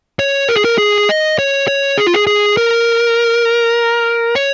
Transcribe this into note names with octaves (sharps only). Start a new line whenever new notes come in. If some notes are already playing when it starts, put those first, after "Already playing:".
C#5
A#4
G#4
A#4
G#4
D#5
C#5
C#5
G#4
F4
G#4
G#4
A#4
C#5